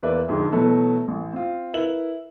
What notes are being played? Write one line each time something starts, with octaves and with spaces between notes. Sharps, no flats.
E2 A#3 B4 D5 E5
F2 G#2 D3 G#3
B2 E3 F#3 A3 B3
A1
C4 F4
E4 A#4 B4 F#7